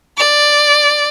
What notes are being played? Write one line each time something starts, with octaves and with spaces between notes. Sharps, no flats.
D5